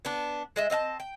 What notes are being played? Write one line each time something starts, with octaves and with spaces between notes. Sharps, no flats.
B3 D4
G#3 D#5 E5
C4 D#5 F5 A5
G5